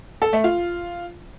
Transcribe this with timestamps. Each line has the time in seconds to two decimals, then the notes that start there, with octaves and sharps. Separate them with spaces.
0.22 A4
0.33 A3
0.44 F4